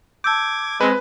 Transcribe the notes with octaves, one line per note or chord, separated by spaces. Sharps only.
A5 D6 E6 G6 G#6
G#3 C4 B4